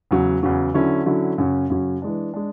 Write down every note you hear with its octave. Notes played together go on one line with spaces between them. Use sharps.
E2 C#3 F#3
E2 C#3 F#3
D3 F#3 C#4 E4
D3 F#3 C#4 E4
F#2 C#3 F#3 C#4
F#2 C#3 F#3 C#4
E3 G#3 D4
G#3 D4